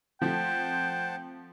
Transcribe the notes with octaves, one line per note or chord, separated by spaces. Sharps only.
F3 A3 C4 C5 F#5 G5 A5